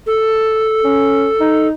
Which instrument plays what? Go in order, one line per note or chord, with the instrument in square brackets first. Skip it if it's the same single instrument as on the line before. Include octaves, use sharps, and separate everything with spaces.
[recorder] A4
[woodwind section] C#4
D#4